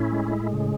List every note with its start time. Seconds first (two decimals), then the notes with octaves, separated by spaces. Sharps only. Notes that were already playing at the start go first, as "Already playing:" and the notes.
Already playing: A2 C#4 E4
0.12 G#3
0.53 C#3